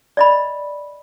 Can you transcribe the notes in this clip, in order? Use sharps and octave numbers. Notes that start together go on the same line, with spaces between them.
D5 D#5 B5